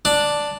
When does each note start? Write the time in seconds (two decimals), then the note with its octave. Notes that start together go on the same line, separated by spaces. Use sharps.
0.05 D4